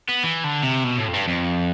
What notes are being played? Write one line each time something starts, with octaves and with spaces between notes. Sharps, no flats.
B3
E3
D3
C3
B2
A2
F2
G2
F2